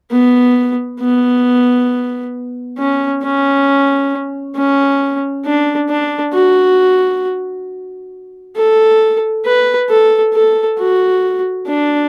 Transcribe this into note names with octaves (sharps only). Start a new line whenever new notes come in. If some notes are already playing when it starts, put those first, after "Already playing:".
B3
B3
C#4
C#4
C#4
D4
D4
F#4
A4
B4
A4
A4
F#4
D4